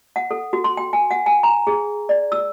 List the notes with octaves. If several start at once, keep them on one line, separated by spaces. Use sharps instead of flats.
F#5
A4
F#4
C6
G5
G#5
F#5
G#5
A#5
G#4
D5
E6